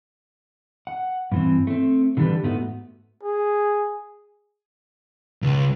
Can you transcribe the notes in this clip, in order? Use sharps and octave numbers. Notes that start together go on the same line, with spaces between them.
F#5
G2 E3 C4
A3 C4
D3 E3 G3 D4 G4 B4
G#2 A3 B3 F#4
G#4
C#2